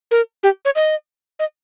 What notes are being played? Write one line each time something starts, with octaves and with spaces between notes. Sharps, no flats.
A#4
G4
C#5
D#5
D#5